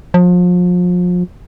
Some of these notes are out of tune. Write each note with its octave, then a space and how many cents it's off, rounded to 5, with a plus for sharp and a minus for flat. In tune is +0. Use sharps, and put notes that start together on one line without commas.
F3 +35